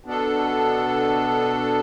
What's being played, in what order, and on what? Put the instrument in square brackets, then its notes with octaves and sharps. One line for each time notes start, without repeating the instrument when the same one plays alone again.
[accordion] B2 B3 D4 A4